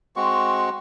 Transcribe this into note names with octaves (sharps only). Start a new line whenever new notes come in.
G#3 C4 F#4 C#6